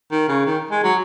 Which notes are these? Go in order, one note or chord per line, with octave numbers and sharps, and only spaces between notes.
D#3
C#3
D#3
G#3
F#3